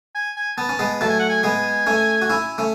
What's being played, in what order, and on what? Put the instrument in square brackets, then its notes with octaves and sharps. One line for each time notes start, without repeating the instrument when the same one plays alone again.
[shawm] G#5
G#5
[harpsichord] B3 [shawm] A5
[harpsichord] C#4
G#3 B3
[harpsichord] F#3 A3 [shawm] A5
[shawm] G#5
F#5
G#5
[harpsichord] G#3 B3 [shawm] G#5
[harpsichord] A3 C#4
F#4
C#4 E4
A3 C#4